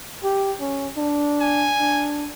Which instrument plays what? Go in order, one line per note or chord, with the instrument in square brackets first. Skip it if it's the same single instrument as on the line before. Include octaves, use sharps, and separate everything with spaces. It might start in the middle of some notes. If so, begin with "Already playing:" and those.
[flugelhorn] G4
C#4
D4
[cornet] G#5
[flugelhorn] D4